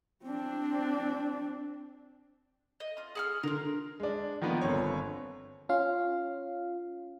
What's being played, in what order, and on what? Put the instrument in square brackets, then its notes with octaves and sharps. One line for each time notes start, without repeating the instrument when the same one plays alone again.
[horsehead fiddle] C4 D4
[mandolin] D#5
F4 D#6
G#4 C#6 F6
[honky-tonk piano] D3 [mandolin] F4 A#4
[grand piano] G#3 D4
D#3 F3 A#3 B3
G1 C4 C#5
[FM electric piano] C#4 F4 F5